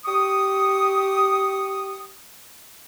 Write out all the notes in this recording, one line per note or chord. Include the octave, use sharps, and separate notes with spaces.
G4 C#6 D#6